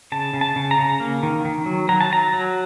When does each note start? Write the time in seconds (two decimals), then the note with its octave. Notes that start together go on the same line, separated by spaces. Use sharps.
0.12 C#3 A5
0.33 C#3
0.41 A5
0.56 C#3
0.71 A#5
0.78 C#3
1.00 A#3
1.23 D#3
1.45 D#3
1.66 F#3
1.89 F#3 A#5
2.01 A5
2.11 F#3 A#5
2.33 F#3